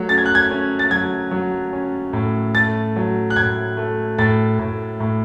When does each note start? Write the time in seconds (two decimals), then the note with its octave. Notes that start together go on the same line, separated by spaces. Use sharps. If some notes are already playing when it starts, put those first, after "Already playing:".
Already playing: F#3 A3
0.09 C#4 A6
0.18 G#6
0.26 F#6
0.35 G#6
0.51 C#4
0.79 A6
0.90 F#3 G#6
1.31 F#3
1.73 C#4
2.13 A2
2.55 A3 A6
2.96 F#3
3.30 F#6
3.36 A2 G#6
3.77 A3
4.18 A2 A6
4.59 A2
5.00 A2